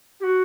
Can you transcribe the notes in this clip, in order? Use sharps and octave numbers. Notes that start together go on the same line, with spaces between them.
G4
F#4